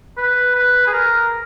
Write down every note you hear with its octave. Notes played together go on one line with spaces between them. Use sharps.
B4
B4
G#4
A#4